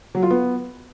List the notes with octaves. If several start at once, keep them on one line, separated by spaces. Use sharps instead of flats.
F#3
F4
B3